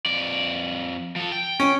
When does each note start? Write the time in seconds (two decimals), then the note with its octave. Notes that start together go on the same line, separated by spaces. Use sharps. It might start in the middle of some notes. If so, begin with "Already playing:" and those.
0.06 F2 D5
1.16 F3 A4
1.32 G5
1.60 C#4